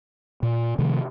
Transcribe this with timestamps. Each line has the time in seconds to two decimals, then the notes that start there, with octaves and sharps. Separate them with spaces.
0.43 A#2
0.79 C3 D#3 F3 A3